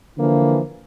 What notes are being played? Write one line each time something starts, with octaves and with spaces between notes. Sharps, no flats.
D3 E3 F3 A#3